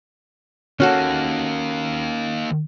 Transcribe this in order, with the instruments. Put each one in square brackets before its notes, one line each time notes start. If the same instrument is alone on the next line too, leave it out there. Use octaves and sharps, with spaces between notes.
[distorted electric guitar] D#3 A#3 [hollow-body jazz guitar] C#4 F#4 A4